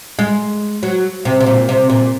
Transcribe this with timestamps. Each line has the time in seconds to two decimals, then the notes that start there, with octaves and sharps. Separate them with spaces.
0.19 G#3
0.83 F#3
1.25 C3
1.41 C3
1.46 A#2
1.69 C3
1.90 A#2